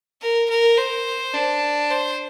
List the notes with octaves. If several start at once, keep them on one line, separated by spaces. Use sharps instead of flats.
A#4
A#4
C5
D4
C5